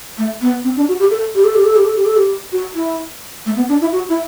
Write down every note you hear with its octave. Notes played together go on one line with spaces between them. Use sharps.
A3
B3
C4
D4
F#4
G4
A4
G4
A4
G4
A4
G4
A4
G4
A4
G4
F#4
E4
A3
B3
D4
E4
F#4
E4